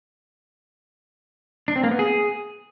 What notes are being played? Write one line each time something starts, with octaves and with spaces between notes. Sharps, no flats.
D4
C4
A#3
B3
G#4